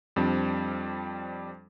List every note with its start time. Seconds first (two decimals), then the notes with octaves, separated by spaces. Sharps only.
0.16 F2 G3 C4 D4